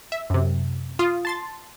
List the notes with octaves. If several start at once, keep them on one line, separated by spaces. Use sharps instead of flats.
E5
F#2 C3
F4 D#6
A5 C6 A6